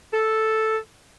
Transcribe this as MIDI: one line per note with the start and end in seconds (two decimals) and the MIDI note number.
0.14 0.78 69